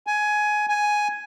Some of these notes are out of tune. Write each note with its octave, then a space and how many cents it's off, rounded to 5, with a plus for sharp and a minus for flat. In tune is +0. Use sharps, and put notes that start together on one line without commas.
G#5 +15
G#5 +5